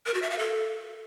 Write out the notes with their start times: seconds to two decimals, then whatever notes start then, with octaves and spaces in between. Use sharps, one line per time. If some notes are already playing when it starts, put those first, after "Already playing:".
0.06 A#4
0.14 F#4
0.22 E5
0.30 F5
0.38 A4